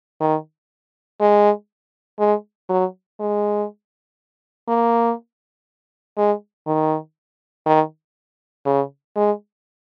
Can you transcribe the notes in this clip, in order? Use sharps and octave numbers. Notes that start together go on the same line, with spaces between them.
D#3
G#3
G#3
F#3
G#3
A#3
G#3
D#3
D#3
C#3
G#3